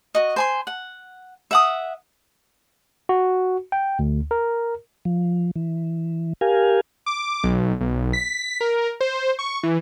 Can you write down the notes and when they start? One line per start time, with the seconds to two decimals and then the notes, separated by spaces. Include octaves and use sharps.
0.15 F#4 D#5
0.36 C5 G#5 C6
0.67 F#5
1.51 E5 F#5 D#6
3.09 F#4
3.72 G5
3.99 D2
4.31 A#4
5.05 F3
5.56 E3
6.41 G4 A#4 F5 G#5
7.06 D6
7.44 B1
7.81 B1
8.13 B6
8.61 A#4
9.01 C5
9.39 C#6
9.63 E3